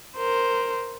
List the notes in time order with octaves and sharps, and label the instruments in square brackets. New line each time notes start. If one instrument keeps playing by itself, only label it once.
[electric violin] A#4 C5